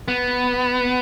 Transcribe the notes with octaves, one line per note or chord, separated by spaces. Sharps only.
B3